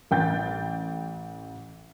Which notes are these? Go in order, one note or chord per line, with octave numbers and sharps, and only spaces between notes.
A1 G5 G6 A6